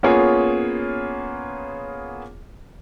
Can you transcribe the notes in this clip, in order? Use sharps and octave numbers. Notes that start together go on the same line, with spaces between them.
A#3 B3 C#4 F4 G#4 C#5